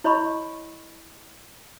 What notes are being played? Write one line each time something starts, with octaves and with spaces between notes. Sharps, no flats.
E4 C#5 D#5 B5 C#6